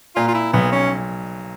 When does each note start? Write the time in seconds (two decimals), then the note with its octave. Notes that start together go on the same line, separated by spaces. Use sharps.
0.16 A#2 F4
0.28 F4
0.35 E4
0.53 B1 B3
0.72 C#4